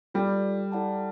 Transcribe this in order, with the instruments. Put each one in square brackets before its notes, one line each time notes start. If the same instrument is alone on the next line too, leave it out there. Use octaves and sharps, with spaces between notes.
[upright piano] G3 [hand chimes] F4 A4 D5
[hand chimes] E4 A4 D5 F#5 A5